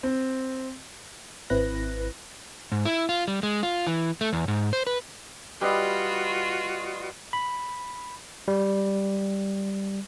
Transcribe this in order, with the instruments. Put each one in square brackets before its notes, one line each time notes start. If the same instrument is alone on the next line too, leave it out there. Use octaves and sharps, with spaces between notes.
[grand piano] C4
[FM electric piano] G#1 C4 E4 B4 F#6 A#6
[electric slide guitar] G#2
E4
F4
G3
G#3
F4
E3
A3
E2
G#2
C5
B4
[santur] G3 B4 D#5 [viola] F4 F#4
[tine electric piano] B5
G3